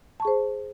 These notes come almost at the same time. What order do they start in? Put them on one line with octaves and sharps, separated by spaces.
A5 C#6 G#4 C5